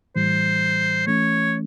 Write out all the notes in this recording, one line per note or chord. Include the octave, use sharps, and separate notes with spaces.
A2 E3 G3 C5
E3 A3 C#4 C#5